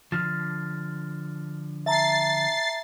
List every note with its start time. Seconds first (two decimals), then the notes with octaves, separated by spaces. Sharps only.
0.12 D3 F3 F6 A6
1.86 E5 A5 A#5 A6 C7